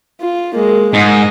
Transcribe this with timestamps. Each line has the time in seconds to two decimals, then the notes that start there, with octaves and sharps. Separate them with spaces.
0.21 F4
0.55 G#3 A#3
0.94 G#2 D#5